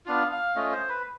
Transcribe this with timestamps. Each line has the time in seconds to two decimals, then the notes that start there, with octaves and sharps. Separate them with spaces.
0.06 B3 D4 F4 F5
0.32 F5
0.56 A3 C#4 F4 D#5
0.72 C5
0.89 B4